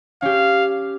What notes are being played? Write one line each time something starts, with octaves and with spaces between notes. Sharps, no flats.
C#4 G4 F5